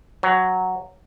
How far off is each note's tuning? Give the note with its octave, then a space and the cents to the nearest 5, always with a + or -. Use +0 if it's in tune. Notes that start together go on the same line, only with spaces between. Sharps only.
F#3 +0 G#5 +20